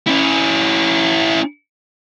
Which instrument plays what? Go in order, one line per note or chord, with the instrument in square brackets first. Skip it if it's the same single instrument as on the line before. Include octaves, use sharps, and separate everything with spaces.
[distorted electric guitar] C#4 E4